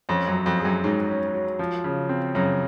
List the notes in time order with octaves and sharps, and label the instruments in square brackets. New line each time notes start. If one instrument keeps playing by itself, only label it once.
[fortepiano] F2 [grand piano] C#4
[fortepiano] F#2
[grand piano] F#3
[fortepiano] F2
[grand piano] G#4
[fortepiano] F#2
[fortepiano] G#2 [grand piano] F#3
[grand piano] C#4
F#3
F3
C#3
C4
[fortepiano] F#2 [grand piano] C#3